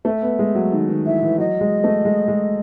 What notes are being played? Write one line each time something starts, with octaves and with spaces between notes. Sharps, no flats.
A3 E5
B3
G#3
F#3
D#3
D#3
E3 E5
E3
F#3 D#5
G#3
A3
G#3
G#3